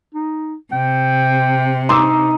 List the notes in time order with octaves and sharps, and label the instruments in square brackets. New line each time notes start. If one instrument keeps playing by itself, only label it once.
[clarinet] D#4
[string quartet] C3 [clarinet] G5
[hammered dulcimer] D#4 [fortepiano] C6 D6 E6